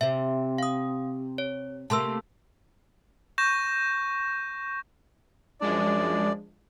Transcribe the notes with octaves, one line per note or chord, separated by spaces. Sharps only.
C3 C4 E5
F5 D#6
C#5
C3 A3 A#3 A5 C6 E6
C#6 G6 A#6 E7
F#2 F3 G#3 D4 D5